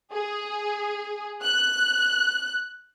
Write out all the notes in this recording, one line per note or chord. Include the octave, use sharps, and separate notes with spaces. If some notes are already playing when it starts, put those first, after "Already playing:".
G#4
F#6